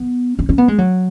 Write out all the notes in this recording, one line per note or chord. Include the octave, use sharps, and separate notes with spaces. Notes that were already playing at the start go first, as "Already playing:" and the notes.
Already playing: B3
C#4
C#4
B3
G#3
F#3